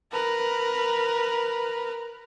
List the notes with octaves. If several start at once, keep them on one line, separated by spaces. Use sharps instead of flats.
A#4 B4